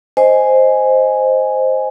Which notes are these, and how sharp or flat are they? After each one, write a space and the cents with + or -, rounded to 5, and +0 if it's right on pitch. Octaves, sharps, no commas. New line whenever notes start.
C5 +0 D#5 +0 G#5 +0